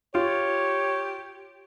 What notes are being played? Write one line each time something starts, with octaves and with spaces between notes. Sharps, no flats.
F4 G4 C#5